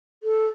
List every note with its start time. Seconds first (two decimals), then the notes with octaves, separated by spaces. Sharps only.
0.23 A4